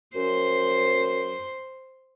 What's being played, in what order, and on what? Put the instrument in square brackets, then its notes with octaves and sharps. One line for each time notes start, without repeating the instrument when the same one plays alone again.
[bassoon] F#2 [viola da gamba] C5